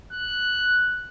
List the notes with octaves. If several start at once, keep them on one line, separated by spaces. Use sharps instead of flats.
F#6